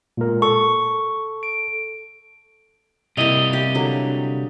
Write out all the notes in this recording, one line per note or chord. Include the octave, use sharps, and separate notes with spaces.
A#2 G#3 A#4
A4 C#6
D7
C3 G3 A#3 E4 D#5 F5
G4 G5
D3 F#3